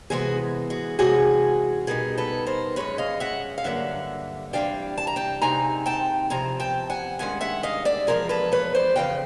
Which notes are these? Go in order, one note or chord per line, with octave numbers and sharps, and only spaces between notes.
C3 E3 G#3 B3 F#4 G#4
F#4 G#4
C3 E3 G#3 C#4 F#4 G#4
B2 G3 B3 D#4 G#4 A#4
A4 B4
A#4 C5
F#2 D#3 G#3 C#4 B4 C#5
D#5 F5
E5 F#5
F5
G2 D3 F#3 A#3 E5 F#5
C3 E3 G3 A#3 D4 F5 G5
A5
A#5
G5 A5
C3 D#3 G#3 C4 D#4 G#5 A#5
G5 A5
E2 C3 F3 G#5 A#5
G5 A5
F#5 G#5
G2 D#3 G#3 C#4 F#5 G#5
E5 F#5
D#5 F5
D5 E5
E2 C3 F3 G#3 G#4 A#4
A4 B4
B4 C#5
C5 D5
F2 C#3 E3 F5 G5